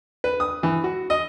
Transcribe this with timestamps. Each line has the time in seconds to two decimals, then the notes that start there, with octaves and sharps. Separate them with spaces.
0.24 B4
0.40 D#6
0.63 E3
0.84 F#4
1.10 D#5